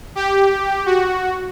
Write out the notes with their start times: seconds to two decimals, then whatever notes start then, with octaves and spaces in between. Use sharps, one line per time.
0.15 G4
0.86 F#4